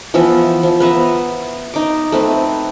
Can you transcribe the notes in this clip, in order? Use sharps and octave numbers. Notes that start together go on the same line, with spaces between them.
E3 F3 B3 E5
F3
B3 B4 E5 A#5
D#4 D6
A3 C4 B4